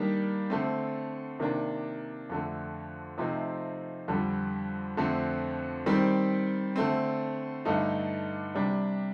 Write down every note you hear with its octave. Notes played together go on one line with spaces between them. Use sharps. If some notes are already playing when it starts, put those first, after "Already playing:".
Already playing: D#3 G3 A#3 D4
D3 A3 C4
C3 D#3 A#3 D4
F2 D3 A3
C3 F3 A3 C4 D#4
F2 D3 G3
F2 D3 A3 C4
D#3 G3 C4
D3 A3 C4
G2 D3 A3 D#4
C3 G3 D4